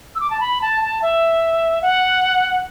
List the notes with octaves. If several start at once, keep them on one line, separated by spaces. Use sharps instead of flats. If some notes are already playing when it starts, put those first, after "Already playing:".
E6
D6
A5
B5
A5
A5
E5
F#5